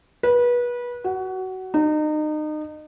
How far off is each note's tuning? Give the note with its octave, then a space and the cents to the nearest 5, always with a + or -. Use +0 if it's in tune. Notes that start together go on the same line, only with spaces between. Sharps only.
B4 -25
F#4 +20
D#4 -30